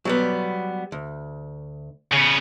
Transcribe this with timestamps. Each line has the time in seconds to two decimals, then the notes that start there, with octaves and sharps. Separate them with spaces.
0.05 F#3 G3 B3
0.92 D2
2.12 C#3 B3